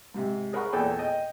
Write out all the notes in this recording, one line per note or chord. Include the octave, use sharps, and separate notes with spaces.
G#2 C3
G#4 A#4 F#5 B5 C#6
E2 A#2 G#4 A4 G5
D#5 G5